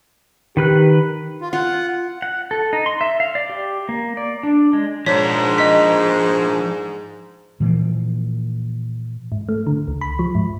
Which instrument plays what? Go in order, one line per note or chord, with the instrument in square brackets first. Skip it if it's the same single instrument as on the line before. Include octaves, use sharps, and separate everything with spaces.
[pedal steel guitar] D#3 B4 F#6 [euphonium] G4
[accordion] F4
[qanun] F4 [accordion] F#5
[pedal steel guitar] F#5
A4
D#4
C6
E5
F5
D5
G4
A#3
D5
D4
G#3
[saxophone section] G#2 [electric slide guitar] F3 D4 [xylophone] C#5 B6
[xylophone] D#5 B6
[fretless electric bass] A#2 E3 F3 A#3
[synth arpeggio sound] G#2
A3
D3
C#2
B5
F3
G#2